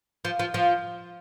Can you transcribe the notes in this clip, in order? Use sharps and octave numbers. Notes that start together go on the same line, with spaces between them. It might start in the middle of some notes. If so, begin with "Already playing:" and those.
F3
F3
F3